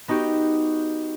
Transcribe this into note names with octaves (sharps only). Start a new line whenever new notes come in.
B3 D#4 F#4 G4